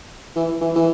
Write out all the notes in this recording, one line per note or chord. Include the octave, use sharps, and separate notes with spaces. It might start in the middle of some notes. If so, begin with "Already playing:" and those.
E3
E3
E3